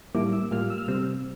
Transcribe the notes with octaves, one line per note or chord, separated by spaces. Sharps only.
A2 G3 A#3 E4 D6
E6
A2 G3 A#3 F4 F6
E6
F6
C3 G3 C4 E6